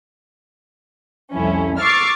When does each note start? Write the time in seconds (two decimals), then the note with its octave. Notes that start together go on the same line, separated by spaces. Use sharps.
1.34 C2 F2 A3 C#4 E4
1.80 C#6 D6 E6 F6 A6 C7